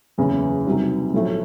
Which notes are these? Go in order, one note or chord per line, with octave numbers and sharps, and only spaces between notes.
F#1 E2 C#3
C2 C3 D#3 F#3
B1 A2 F3 A3